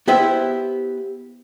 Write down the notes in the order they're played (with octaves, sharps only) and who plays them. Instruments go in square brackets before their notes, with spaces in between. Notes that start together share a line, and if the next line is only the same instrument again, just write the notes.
[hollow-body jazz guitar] B3 E4 G4 C5 E5